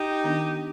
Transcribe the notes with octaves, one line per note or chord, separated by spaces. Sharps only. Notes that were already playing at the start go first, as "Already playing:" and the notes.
Already playing: D#4 G4
D#3 B3 D4